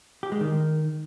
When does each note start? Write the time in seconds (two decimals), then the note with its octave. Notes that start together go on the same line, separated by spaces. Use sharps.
0.23 G4
0.32 G#3
0.41 D#3